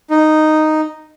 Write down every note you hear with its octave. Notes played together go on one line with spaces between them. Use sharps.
D#4